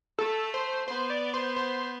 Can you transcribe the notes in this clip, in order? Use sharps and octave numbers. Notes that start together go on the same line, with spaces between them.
A3 A4
C5
B3 C5
D5
C5
C5